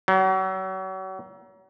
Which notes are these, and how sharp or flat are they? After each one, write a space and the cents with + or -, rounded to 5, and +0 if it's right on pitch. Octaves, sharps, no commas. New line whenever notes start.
F#3 +35